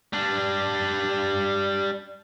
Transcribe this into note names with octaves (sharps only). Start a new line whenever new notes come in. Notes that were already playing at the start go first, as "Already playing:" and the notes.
G3 D4